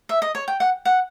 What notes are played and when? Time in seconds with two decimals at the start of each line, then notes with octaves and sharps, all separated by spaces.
0.09 E5
0.22 D#5
0.35 C#5
0.48 G5
0.60 F#5
0.85 F#5